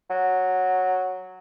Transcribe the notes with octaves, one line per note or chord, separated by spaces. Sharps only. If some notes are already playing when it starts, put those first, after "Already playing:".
F#3